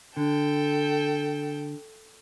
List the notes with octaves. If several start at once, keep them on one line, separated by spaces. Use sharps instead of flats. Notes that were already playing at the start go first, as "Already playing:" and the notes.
D3 A4 G5